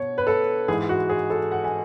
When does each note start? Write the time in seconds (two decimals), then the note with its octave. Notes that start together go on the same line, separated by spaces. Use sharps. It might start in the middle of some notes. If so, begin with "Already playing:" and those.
Already playing: B2 C#5
0.18 B4
0.27 A4
0.68 G#2 E3 G#3 G#4
0.89 F#4
1.09 G#4
1.30 A4
1.52 F#5
1.64 G#5